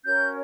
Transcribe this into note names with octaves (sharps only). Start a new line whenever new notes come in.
C#4 F#4 A#4 C#5 G6